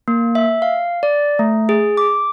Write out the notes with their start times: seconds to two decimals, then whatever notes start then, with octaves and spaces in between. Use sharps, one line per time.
0.08 A#3
0.35 E5
0.62 F5
1.03 D5
1.39 A3
1.69 G#4
1.97 D6